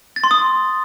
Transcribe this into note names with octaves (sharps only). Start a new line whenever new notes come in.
A6
C6
D#6